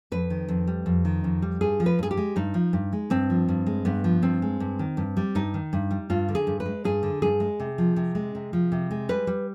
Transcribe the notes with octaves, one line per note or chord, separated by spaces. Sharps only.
F2 B4
D#3
F2
G3
F2
D#3
F2
G3
G2 G#4
F3
B4
G2 G#4
G4
G#3
G2 D#4
F3
G2
G#3
G2 C4
F3
G2
G#3
G2 B3
F3
G2 C4
G#3
G2
D#3
G2
G3
G2 D#4
D#3
G2
G3
G2 F4
D3
G#4
G2
B4
G#3
G2 G#4
D3
G2 G#4
G#3
C3
F3
C3
G#3
C3
F3
C3
G#3
G3 B4
G3